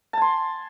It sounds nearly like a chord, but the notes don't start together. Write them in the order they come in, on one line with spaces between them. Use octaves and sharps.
A5 G#5 C6